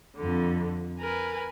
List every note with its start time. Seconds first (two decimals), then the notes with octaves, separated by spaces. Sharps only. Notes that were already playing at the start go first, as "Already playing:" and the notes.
0.16 F2 D3
1.00 A#4 B4 G#5